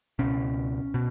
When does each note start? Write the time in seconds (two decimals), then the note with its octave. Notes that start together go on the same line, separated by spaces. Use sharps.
0.19 C#2 B2 C#4
0.94 B2